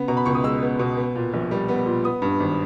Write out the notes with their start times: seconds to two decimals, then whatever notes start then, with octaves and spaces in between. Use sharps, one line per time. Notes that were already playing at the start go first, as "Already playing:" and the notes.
Already playing: C#3 B3
0.08 B2 A#5
0.17 B5
0.26 C#2 C#6
0.35 D#6
0.44 G#3 E6
0.62 B3
0.79 B2
0.97 B3
1.16 A#2
1.34 A#1
1.51 G3
1.68 B3
1.86 A#2
2.04 B3 D#6
2.22 G2
2.40 G#1